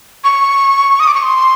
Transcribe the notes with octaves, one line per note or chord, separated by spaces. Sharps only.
C#6
D#6
D6
C#6
C6